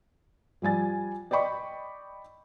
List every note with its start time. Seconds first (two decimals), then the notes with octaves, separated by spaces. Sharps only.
0.62 F3 G3 G#5 A6
1.31 D5 D#5 G5 B5 C#6